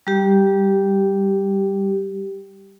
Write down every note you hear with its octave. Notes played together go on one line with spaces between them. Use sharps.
G3 G4